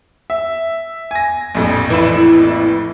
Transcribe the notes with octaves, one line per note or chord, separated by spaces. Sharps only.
E5
G#5 A#6
A#1 F2 A2
E3 E4